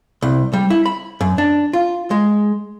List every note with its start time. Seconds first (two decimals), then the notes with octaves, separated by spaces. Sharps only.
0.22 C2
0.53 G3
0.70 E4
0.86 B5
1.21 F#2
1.38 D4
1.73 F4
2.11 G#3